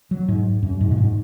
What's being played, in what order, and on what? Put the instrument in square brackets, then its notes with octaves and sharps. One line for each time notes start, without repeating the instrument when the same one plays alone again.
[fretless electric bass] F#3
G#2
F#2
G#2
A#2
G#2